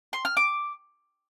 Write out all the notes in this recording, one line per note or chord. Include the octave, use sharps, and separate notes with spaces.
C6
F6
D6